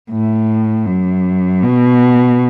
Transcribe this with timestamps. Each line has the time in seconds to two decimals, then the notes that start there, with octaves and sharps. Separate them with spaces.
0.11 A2
0.86 F#2
1.63 B2